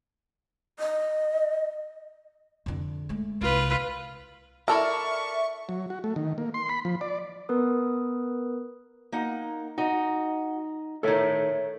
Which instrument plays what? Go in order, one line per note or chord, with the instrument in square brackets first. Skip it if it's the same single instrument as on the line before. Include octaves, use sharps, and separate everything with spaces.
[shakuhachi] D#5
[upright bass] F2 D3
G#3 A3
[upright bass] C2 [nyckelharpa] F4 B4
[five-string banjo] E4 A4 A#4 [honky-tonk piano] D5 A5 F6 [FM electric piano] E5 [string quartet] C#6
[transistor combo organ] F#3
F#4
A3
D#3
A#3
C6
B5
F3
D5
[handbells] B3 A#4 B4 D#6
[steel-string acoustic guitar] A#3 D#4 F#5
[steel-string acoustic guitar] D#4 D#5 [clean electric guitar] F#4
[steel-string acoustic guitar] D#3 A3 [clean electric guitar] A4 C#5 E5